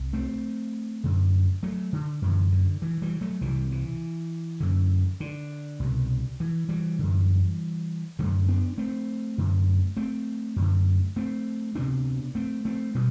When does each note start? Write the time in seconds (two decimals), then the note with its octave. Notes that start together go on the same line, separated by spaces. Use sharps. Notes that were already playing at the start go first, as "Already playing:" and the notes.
Already playing: C2
0.13 A3 C4
1.04 F#2 D3
1.63 F#3 A3
1.93 D3
2.22 F#2 D3 E3
2.52 D3
2.82 E3
3.02 E3 G3
3.21 F#3 A3
3.41 C2 C3 E3 G3
3.72 E3
4.60 F#2 D3
5.20 D3
5.80 C2 B2
6.40 E3
6.69 E3 G3
6.99 F#2 D3
8.19 F#2 D3 F#3 A3
8.48 B3 D4
8.78 A3 C4
9.38 F#2 D3
9.97 A3 C4
10.56 F#2 D3
11.16 A3 C4
11.75 D2 C3 B3 D4
12.35 A3 C4
12.65 A3 C4
12.95 B2 G3 B3